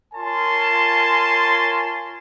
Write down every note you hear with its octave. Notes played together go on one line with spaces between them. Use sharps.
F4 A#4 C#5 G#5 A5 C6